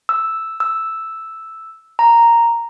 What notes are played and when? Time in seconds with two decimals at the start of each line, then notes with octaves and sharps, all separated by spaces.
0.09 E6
0.60 E6
1.99 A#5